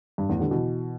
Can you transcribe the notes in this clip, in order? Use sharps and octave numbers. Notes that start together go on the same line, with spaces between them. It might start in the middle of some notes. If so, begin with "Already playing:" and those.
G2
E2 A2
D3 G3
B2 E3